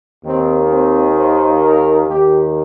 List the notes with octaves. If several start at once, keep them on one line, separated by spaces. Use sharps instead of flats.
D#2 D#3 C4
C4
C5
A#4
D#2 D#3 G4